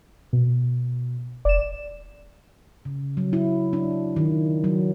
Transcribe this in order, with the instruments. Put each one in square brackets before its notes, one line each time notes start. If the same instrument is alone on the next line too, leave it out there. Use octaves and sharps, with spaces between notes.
[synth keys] B2
[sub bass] F1 [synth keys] D5 E7
[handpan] C#3
F#3
E4
D4
D#3
F#3